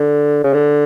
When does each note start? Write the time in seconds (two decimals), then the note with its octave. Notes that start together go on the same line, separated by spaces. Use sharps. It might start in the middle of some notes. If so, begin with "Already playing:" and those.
Already playing: D3
0.44 C#3
0.53 D3